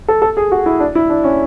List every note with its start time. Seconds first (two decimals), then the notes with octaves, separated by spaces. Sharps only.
0.08 A4
0.22 A4
0.37 G#4
0.52 F#4
0.66 E4
0.80 D4
0.95 E4
1.10 D4
1.24 C#4